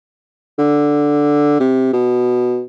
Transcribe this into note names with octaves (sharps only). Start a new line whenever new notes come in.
D3
C3
B2